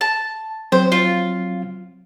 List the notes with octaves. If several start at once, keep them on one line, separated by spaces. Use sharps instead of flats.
A5
F#3 C4 C5
F4